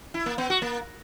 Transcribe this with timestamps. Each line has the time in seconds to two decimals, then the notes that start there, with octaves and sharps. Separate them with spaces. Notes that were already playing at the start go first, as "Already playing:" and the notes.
0.14 E4
0.26 A#3
0.38 B3
0.50 F#4
0.62 A#3